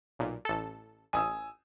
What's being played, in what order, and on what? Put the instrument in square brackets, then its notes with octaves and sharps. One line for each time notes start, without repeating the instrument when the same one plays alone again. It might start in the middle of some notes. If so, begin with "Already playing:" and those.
[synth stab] B1 A#2
A1 A4
[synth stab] A1 [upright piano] G#5 D#6 E6